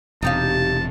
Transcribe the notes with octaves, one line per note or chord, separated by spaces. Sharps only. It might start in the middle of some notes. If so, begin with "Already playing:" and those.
E1 C3 D#4 G4 F5 A5